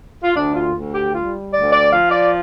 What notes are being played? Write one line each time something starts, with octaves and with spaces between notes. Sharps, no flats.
F4
D2 D4
F4
D2
G4
G3 F4
D2 D5
D5
F3 F5
D5